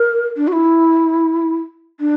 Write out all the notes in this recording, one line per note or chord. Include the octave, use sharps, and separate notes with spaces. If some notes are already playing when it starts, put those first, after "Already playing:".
Already playing: A#4
D4
F#4
E4
D4